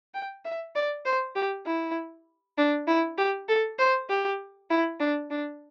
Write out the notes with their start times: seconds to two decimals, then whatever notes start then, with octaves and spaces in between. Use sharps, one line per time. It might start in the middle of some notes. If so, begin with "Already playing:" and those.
0.14 G5
0.45 E5
0.75 D5
1.05 C5
1.36 G4
1.66 E4
2.58 D4
2.87 E4
3.18 G4
3.49 A4
3.79 C5
4.09 G4
4.70 E4
5.00 D4
5.30 D4